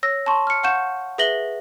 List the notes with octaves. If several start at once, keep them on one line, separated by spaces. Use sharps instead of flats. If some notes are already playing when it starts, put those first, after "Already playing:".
C#5 E6 A#6
A5 C6 C#6
F6 C#7
F5 F#5 C#6 G6 E7
G#4 B4 E5 A#6 F#7 G7